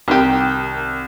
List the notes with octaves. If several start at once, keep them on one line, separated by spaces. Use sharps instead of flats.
C2 D#3 G4